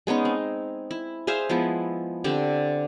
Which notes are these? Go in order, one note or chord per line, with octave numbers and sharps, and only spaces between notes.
G#3 B3 C#4 D#4
C4
E4
G#4 C5 E5 F5
F3 G#3 B3 E4
D3 C4 D4 G4